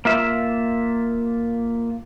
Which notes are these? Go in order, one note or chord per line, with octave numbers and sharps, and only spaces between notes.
A#3 F4 E5